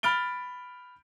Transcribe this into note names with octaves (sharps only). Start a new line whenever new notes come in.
B5 F6 A6 D7 G7